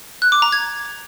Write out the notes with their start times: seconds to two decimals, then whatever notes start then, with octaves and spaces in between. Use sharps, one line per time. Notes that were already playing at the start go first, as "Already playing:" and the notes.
0.22 F#6
0.32 D6
0.42 A#5
0.52 G#6